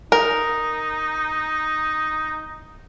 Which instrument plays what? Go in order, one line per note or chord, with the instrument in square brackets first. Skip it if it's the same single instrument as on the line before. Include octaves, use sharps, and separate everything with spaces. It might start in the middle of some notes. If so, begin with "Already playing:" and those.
[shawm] D#4 [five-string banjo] A#4